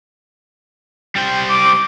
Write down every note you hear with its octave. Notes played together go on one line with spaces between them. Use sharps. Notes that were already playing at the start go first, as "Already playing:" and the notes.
G3 C5 G5
D6